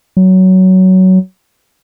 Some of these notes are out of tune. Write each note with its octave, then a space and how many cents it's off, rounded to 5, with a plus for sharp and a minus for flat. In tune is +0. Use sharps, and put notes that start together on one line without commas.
F#3 +15